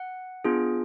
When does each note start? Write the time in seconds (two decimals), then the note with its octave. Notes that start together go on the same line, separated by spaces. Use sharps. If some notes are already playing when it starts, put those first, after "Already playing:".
Already playing: F#5
0.44 B3 D4 F4 G#4